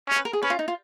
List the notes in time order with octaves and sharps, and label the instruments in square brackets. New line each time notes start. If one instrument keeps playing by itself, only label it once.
[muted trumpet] C#4 [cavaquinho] C#5
[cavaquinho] B4
A#4
G#4
[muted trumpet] C#4 [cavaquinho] B4
[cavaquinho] F4
D#4
F4